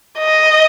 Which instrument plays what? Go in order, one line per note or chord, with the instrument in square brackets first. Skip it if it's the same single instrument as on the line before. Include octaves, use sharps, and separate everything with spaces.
[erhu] D#5